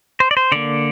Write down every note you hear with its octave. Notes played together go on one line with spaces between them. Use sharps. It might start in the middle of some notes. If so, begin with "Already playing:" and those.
C5
D5
C5
D3 A#3 D5